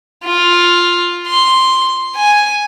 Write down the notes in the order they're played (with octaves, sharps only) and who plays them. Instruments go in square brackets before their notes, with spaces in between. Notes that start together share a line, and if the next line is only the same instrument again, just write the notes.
[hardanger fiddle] F4
C6
G#5